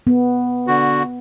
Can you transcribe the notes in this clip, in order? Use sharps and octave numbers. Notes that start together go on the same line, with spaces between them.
B3
D3 F#4